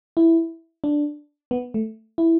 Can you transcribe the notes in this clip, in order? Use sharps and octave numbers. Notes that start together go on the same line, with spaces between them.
E4
D4
B3
A3
E4